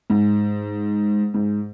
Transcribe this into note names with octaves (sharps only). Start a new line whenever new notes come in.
G#2
G#2